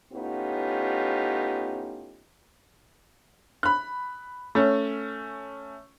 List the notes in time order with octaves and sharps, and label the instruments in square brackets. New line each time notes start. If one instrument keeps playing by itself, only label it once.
[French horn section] A2 B3 C#4 D#4 F4 G4
[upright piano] B5 F#6
A3 C#4